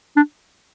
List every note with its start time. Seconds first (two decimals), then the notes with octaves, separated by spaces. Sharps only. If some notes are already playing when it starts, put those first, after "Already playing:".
0.16 D4